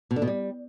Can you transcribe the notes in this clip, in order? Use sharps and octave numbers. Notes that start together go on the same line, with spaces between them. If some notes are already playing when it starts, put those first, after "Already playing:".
B2
D3
B2
G3